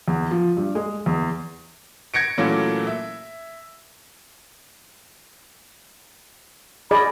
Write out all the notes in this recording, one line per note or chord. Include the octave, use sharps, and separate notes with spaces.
E2
F3
G2
G#3
E2
G#6 A#6 C#7 D7
A#2 E3 F#3 A3 A#3 C#4
E5
G#4 D5 D#5 B5